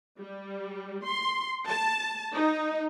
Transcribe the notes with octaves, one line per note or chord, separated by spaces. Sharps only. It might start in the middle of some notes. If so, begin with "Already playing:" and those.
G3
C6
A5
D#4